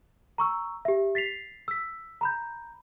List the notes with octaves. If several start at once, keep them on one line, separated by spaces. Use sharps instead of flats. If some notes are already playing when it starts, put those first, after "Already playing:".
A#5 C#6 E6
G4 E5
A6 B6 C7 F7
E6 B6
A#5 B5 G6